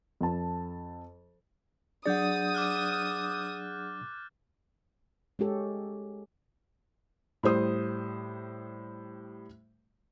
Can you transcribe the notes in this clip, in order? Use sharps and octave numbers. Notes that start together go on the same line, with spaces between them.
F2 A5
F#3 D4 G#4 D5 F#5 D#6 G6 A6
D6 F6 F#6
G#3 C#4 G4 A4
A2 G3 C5 D#6